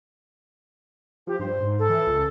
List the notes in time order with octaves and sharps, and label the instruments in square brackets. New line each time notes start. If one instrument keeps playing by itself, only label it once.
[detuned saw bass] F3 [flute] G4
[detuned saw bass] G2 [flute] C5
[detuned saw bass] G#2
[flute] A4
[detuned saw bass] E3
C#2